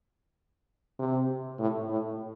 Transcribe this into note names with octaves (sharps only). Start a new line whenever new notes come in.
C3
A2
A2